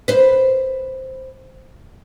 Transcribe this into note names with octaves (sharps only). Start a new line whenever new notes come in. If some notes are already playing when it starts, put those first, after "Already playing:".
B4 C5